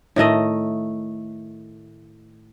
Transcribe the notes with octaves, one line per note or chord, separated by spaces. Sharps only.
A2 D#3 A3 D#5